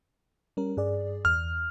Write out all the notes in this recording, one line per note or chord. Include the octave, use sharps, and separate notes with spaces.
G3 C#4 A#4
G2 G#4 D5
E2 F6